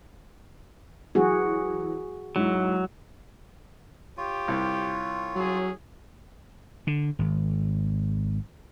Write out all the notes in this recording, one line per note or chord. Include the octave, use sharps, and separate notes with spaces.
E3 F#3 F#4 G#4
G#2 F#3 E4
F4 G4 C#5
C2
F#3 C#4 G#4
D3
G#1